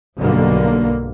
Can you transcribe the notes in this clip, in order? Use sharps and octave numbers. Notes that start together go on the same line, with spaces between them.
B1 G2 B2 D3 A#3